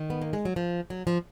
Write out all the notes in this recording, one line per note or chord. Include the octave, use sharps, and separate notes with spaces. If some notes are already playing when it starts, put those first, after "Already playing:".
Already playing: D#3
B3
A#3
G#3
F#3
F3
F#3
F3